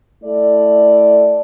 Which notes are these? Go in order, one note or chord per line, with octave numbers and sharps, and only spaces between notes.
A3 E4 A4 D5